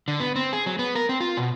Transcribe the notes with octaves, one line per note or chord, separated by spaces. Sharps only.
D3
B3
C4
G#4
F#3
B3
A#4
C4
F4
B2